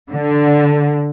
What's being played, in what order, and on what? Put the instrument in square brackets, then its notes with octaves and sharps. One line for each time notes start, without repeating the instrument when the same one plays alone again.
[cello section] D3